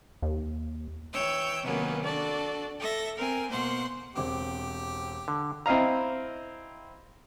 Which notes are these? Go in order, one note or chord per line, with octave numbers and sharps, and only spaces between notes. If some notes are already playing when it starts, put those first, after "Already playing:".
D#2
E3 C#5 G5 E6 G6
C3 D#3 F#3 A#3 B3 C#4
D4 F#4 A4 D5
A4 E5 A#6
C4 A#4 G#5
B2 A#3 C5 F#5 C6
E1 C4 G4 D6
D3
C4 E4 D#5 F5 A#5